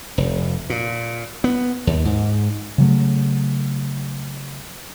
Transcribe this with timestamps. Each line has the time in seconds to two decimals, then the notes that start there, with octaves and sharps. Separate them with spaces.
0.18 F1
0.70 A#2
1.44 B3
1.87 D#2
2.05 G#2
2.78 C#3 F#3 A3